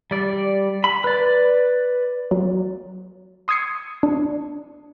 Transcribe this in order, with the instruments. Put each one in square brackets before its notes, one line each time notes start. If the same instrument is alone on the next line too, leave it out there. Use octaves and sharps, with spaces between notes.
[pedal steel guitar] G3 D5
B5
B4 D5
[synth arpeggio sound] F#3
C6 D#6 E6 G#6 C7 C#7
D4